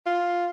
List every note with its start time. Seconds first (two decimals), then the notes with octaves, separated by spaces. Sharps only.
0.06 F4